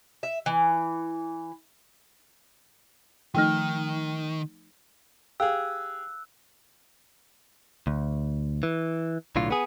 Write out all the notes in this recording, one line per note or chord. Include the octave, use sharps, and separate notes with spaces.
E5
E3
D#3 F3 A3 D#4 G5 F6
G4 G#4 F5 E6 F#6
D2
E3
B1 A2 D3 F4
B3 G#4